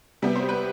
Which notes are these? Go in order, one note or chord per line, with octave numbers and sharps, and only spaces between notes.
C3 G3 B3
C5
B4